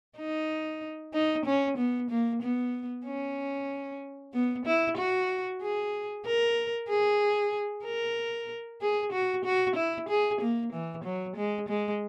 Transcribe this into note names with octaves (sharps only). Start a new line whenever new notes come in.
D#4
D#4
C#4
B3
A#3
B3
C#4
B3
E4
F#4
G#4
A#4
G#4
A#4
G#4
F#4
F#4
E4
G#4
A#3
E3
F#3
G#3
G#3